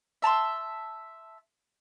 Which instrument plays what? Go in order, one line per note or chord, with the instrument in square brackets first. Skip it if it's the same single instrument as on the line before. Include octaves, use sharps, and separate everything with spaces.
[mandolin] E5 A5 A#5 C6